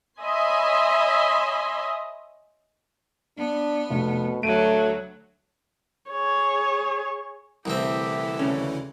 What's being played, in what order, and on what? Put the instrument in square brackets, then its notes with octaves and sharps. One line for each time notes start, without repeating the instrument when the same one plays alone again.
[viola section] C#5 D#5 E5 G#5 B5 C6
[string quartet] B3 [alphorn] D4
[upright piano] F1 [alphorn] B2
[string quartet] D2 F#3 [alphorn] A3 [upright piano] D7 D#7
[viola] G#4 C#5
[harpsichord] C2 A2 C4 [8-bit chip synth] D3 E3 E4 [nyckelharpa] G4 E5
[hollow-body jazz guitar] D2 C#3 C#4